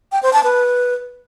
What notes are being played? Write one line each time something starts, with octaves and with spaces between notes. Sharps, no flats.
G5
C5
A5
B4